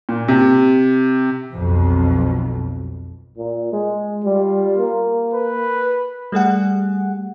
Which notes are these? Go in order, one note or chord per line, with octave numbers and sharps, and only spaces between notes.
A#2
C3
B1 F2
A#2
G#3
G3 F4
A#3
B4
G3 A3 G#4 F#5